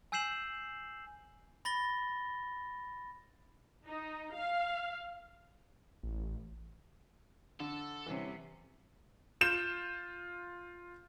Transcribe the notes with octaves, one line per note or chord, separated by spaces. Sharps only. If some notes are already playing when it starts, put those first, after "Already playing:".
G#5 E6 G6 C7 E7 F#7
B5 A6 A#6 G7
D#4
F5
A1
D3 A4
C3 E3 G3 C#4
F4 G6 E7